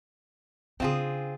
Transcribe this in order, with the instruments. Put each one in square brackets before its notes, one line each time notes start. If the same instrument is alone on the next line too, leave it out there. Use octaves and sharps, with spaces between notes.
[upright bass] C#3 D4 [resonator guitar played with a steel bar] C4 F4 G#4